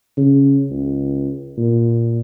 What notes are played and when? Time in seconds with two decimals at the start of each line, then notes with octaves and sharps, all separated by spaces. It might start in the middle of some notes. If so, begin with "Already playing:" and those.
0.17 C#3
0.70 C#2
1.58 A#2